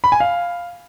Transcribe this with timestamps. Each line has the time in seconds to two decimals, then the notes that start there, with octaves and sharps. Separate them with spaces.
0.04 B5
0.12 G#5
0.20 F5